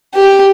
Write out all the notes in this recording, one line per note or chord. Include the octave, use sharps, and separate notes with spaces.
G4